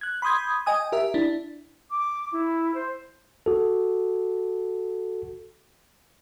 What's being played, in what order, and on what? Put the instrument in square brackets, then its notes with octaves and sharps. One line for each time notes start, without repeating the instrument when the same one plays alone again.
[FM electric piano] F#6 G#6
B5 C6 D#6 G6 G#6
D#5 G5 G#5 D#6
G4 A#4 E5
D4 E4
[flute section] D6
E4
C5
[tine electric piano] F#4 A4